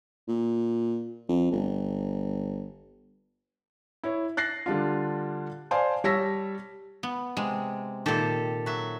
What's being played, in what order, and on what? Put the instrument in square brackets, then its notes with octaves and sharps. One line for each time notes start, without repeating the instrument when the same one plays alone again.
[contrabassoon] A#2
F2
G1
[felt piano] E4 C#5
F#6 A6 A#6 C7
D3 G3 D4 F4
C5 D5 F5 G#5 A5 C6
G3 C#5 A5 E6 A#6 B6
[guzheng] B3
[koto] C3 [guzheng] G#3
[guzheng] A#2 D#3 [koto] G4 A4 C5
[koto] F#3 E5